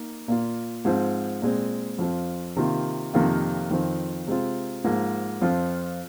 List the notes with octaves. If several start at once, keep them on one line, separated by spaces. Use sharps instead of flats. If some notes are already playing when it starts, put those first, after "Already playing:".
Already playing: A#3 D#4
A#2 A#3 F4
G#2 F3 C4
A#2 G#3 C4
F2 F3 C4 F4
C3 D#3 A#3 F4
F2 C3 D#3 A#3 F4
F2 D#3 C4 F4
C3 G#3 C4 F4
G#2 F3 A#3
F2 F3 C4 F4